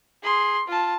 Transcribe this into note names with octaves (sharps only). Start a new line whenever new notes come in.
G#4 C6
F4 A5